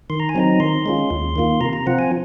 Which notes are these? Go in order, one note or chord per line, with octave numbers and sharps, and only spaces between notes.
D#3 C6
A#5
G#5
F#3 C4 D#4 A#5
D#3 C6
G#3 C#4 F4
D#2
D#3 A#3 F4
C3 A#5
A#5
F3 C4 F4 F#5
G#5